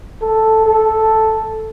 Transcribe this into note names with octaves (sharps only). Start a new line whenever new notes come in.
A4
A4